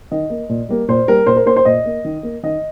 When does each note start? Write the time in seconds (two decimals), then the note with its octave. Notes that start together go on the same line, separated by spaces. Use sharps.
0.11 D#3 D#5
0.30 A#3
0.49 A#2
0.69 G3 A#3
0.88 A#2 C5
1.08 G3 A#3 A#4
1.26 A#2 C5
1.36 A#4
1.46 A#3 C5
1.56 C5
1.65 A#2 D#5
1.86 A#3
2.05 D#3
2.23 A#3
2.43 D#3 D#5